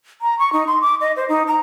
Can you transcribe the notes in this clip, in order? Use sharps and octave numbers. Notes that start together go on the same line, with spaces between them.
A#5
C#6
D#4
C6
D6
D#5
C5
D#4
A#5